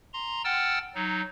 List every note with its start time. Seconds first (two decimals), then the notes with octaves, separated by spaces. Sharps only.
0.13 A#5 C6
0.44 F#5 G5 A5 E6 F6 A6
0.95 F#3 D#4